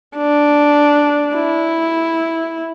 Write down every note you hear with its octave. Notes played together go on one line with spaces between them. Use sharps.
D4
E4